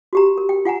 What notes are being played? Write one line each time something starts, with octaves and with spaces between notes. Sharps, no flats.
F#4 G4 A#5
A#4
G5
F4 F#5 G#5 A#5